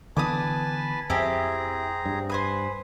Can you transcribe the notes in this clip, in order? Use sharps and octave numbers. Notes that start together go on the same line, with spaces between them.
D3 E3 B3 B4 G#5 A5 D6 D#6
F2 C4 E4 G4 G#4 G#5 A#5
G2
B4 C5 G#5 D#6